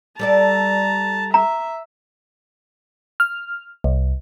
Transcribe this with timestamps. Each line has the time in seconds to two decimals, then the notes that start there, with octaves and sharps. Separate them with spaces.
0.19 G3 A4 D5 A5 A#5
1.34 E5 A#5
3.20 F6
3.84 C2